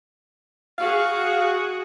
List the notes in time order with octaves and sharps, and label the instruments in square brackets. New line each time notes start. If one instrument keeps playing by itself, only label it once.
[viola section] F#4 G#4 [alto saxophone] F5